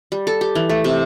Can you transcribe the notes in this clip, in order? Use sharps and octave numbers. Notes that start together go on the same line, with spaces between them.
G3
A4
G4
E3
A3
C3